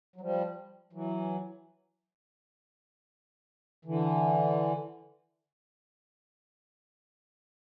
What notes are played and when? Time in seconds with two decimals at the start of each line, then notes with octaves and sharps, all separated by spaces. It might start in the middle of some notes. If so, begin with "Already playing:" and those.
0.16 F#3
0.21 F3 G3
0.93 E3 F#3
3.85 D3 E3